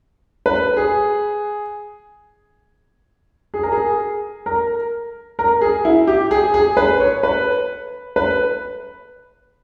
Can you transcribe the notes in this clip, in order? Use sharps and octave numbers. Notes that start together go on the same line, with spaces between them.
B4
G#4
G#4
A#4
G#4
A#4
A#4
G#4
E4
G4
G#4
G#4
B4
C#5
B4
B4